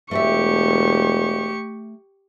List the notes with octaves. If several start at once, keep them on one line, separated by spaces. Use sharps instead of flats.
E1 A3 G4 D5 E5 C#6